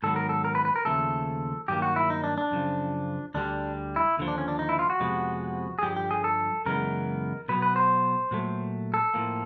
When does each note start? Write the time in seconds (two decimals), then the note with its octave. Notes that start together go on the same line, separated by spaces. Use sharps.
0.03 G#2 D#3 F#3 B3 A4
0.16 A#4
0.29 A4
0.45 A#4
0.55 B4
0.65 B4
0.76 A#4
0.85 D#2 C#3 F3 A3 A4
1.68 G2 D#3 F#3 A#3 G4
1.82 F#4
1.96 E4
2.10 D#4
2.24 D4
2.38 D4
2.51 F#2 C#3 F3
3.34 D2 D3 G3 D4
3.96 E4
4.17 D#2 D3 F3
4.28 D4
4.38 C#4
4.48 D4
4.59 D#4
4.69 E4
4.79 F4
4.90 F#4
5.00 F2 C3 F3 G#3 B3
5.79 G#4
5.83 G2 D3 F3 G4
5.96 G4
6.11 G#4
6.24 A4
6.65 F#2 C#3 E3 G#3 B3 A#4
7.48 B2 F#3 B3 B4
7.62 B4
7.76 C5
8.31 A#2 F#3 A3
8.94 A4
9.14 A2 F3 A#3